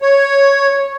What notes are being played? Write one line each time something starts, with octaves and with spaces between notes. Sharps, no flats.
C#5